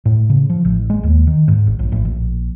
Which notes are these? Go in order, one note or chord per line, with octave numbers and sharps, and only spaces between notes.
A2
C#3
F3
A1
G#3
D#2
D#3
G#2
G#1
A#1
A1
A#1